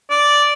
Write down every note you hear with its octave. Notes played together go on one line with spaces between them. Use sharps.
D5